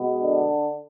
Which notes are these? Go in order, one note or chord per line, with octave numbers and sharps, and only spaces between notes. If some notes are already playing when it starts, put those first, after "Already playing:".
Already playing: B2 G#3 B3
D3 D4